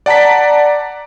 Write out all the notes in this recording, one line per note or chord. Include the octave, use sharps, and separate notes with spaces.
D5 F#5 A5 A#5 B6